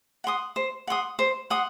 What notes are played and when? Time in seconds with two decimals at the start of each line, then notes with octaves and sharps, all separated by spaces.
0.24 F#5 C6 D#6
0.56 C5
0.87 F#5 C6 D#6
1.19 C5
1.50 F#5 C6 D#6